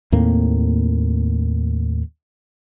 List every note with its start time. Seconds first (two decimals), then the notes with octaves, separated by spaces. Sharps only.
0.12 D#2 A2 A#3 C4